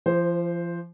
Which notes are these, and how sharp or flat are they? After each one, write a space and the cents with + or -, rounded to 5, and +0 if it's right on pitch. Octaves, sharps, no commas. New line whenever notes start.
F3 -35 C5 +0